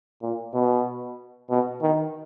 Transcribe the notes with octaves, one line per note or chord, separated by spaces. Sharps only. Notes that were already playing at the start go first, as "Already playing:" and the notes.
A#2
B2
B2
D#3